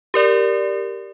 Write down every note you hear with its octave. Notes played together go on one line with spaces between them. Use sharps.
G4 A#4 D5